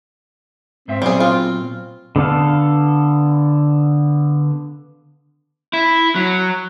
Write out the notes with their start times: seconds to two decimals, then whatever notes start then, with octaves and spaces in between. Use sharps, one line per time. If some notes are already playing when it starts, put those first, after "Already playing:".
0.88 G#2 C4 C5 E5
1.02 A#2 F#3 G3 B3 G#4
1.20 F4
2.16 D3 B3 A4 F5
5.73 E4
6.15 F#3